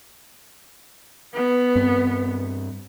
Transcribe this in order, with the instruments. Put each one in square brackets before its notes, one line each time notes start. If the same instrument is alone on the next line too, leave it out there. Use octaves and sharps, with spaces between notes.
[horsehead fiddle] B3
[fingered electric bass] G2 C4